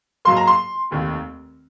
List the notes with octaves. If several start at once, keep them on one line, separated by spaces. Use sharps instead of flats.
G#2 F#3 A#3 C6
A#5
C6
F1 D#2 D#3